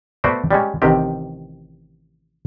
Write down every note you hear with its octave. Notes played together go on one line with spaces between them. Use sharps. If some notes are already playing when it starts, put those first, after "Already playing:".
A3 B3 F#4 C5 D5
G3 G#3 C#4
A1 C3 D#3 C4 G4